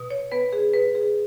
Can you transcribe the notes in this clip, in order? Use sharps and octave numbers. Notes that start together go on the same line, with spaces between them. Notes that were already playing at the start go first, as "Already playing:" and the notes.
Already playing: B2
C#5
B3 B4
G#4
B2 B4
G#4